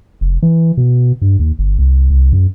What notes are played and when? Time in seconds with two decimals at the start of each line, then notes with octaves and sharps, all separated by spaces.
0.21 F1
0.43 E3
0.77 B2
1.22 G2
1.39 D#2
1.59 G1
1.79 C2
2.10 C2
2.33 F#2